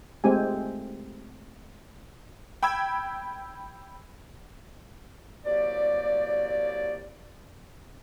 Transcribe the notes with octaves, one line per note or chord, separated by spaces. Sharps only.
G#3 A3 C4 G4 G#5
G5 B5 E6 G#6
C2 F#3 A#3 G4 D5